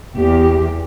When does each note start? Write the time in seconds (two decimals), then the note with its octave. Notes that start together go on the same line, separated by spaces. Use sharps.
0.16 E2 G4